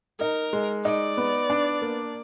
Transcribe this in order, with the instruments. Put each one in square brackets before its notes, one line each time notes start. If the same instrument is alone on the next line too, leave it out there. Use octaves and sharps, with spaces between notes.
[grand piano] D#4 [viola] A#4
[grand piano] G#3
[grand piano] D#4 [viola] D5
[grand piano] B3
D4
A#3